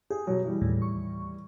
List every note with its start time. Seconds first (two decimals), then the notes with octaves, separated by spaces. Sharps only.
0.10 G4 G#4
0.27 B2 F#3
0.44 E3 G3
0.62 D#2 A2
0.82 C#6